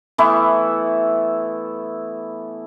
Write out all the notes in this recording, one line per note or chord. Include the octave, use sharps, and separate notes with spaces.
E3 A3 B3 E4